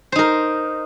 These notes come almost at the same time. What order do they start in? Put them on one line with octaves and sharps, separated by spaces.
C5 D#4 A#4